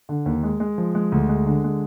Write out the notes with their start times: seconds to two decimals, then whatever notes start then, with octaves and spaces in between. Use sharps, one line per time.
0.09 D3
0.26 D#2
0.43 G#3
0.60 G#3
0.78 F3
0.95 G#3
1.12 D2
1.29 G#3
1.46 D3
1.64 G#3